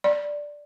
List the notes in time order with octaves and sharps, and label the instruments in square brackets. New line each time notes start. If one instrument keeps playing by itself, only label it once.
[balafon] D5